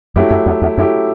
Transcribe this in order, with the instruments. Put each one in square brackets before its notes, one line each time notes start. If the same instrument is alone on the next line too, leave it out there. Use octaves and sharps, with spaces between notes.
[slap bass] F#2 [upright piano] F#3 A3 E4 G4
[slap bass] F#2
E2
E2
[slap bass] F#2 [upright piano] F#3 A3 E4 G4